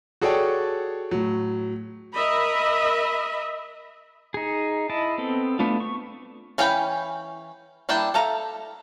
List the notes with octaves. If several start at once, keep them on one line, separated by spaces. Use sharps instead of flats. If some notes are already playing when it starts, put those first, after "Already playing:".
F#4 G#4 A4 C#5 D5 G5
A2 F#3
A#4 D#5 E5 B5
D#4 G#4
E4 D#5 A5
B3 C4 A4
A3 B3 D4 F4
C#6
E3 C#4 F5 G5 B5
G3 A#3 D4 E4 G5
A4 E5 F5 A#5